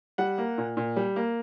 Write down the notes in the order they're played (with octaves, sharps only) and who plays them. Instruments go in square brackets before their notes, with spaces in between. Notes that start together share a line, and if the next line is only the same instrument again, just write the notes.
[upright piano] G3 F#5
A#3
A#2
A#2
G3
A#3